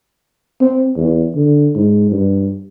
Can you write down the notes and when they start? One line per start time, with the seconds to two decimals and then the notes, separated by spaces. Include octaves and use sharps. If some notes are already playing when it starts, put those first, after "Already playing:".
0.61 C4
0.96 E2
1.35 D3
1.75 G#2
2.11 G2